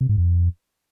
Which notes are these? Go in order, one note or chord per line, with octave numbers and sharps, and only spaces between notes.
C3
G#2
F2